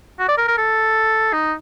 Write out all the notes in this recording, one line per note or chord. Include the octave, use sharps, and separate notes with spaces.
F#4
D5
A#4
A#4
A4
D#4